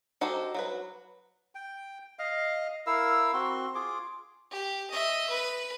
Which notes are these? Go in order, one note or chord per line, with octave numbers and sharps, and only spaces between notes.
D#4 F#4 G4 A4 C5
F#3 F#4 B4
G5
D#5 F5
E4 A#4 F5 E6
C4 F#4 C6
F4 G#4 D6
G4
D#5 E5
B4